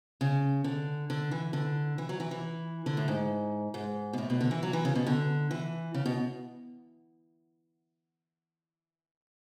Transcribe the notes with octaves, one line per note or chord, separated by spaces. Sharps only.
C#3
D3
D3
E3
D3
E3
F#3
E3
E3
D3
A2
G#2
G#2
B2
A2
B2
D3
E3
F#3
E3
C#3
B2
D3
E3
C#3
B2